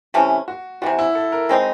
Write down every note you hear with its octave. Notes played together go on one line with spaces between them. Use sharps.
C3 E3 A3 C#4
F#4
C3 E3 G3 F#4
E4
A4
A#4
G#3 C4 D#4 B4